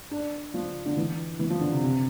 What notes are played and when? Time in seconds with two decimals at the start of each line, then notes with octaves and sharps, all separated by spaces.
0.11 D4
0.54 F3
0.86 D3
0.97 E3
1.39 E3
1.50 F3
1.61 D3
1.72 C3
1.83 C3